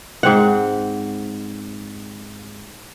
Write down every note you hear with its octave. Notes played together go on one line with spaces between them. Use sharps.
G#2 C4 F#5